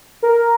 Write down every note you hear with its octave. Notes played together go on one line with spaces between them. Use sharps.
A#4